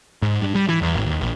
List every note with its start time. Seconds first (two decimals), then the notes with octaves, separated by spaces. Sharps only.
0.22 G#2
0.42 G2
0.55 G3
0.69 E3
0.82 E2
0.95 G#1
1.06 D#2
1.21 A#1